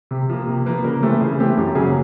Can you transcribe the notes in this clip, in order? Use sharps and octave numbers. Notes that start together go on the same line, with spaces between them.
C3
F3 A#3
C3
F3 A#3 B4
C#3 A#4
E3 A3 C4 G4
C#3 G#4
E3 A3 C4 G4
F#2 G4
C#3 F#3 A#3 G#4